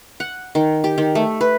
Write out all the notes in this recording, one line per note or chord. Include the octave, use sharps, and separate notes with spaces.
F#5
D#3
G4
D#3
A3
B4